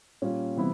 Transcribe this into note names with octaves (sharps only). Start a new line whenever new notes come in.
A#2 G3 A#3 C#4
C3 E3 G3 B3 E4